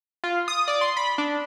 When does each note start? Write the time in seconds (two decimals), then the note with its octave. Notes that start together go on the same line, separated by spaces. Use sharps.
0.24 F4
0.48 D#6
0.68 D5
0.81 C6
0.97 B5
1.18 D4